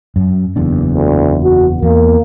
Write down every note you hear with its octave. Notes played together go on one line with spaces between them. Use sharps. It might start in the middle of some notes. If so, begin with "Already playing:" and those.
F#2
F#1 E2 D4
D2
F#4
E2 A#3